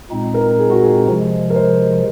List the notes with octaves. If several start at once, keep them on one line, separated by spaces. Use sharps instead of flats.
A#2 G#3 C4 D#4
A#4
G#4
F#4
G#4
C3 F3 G#3
A#4
C5